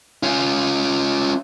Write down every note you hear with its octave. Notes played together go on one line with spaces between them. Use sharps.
C#4 F4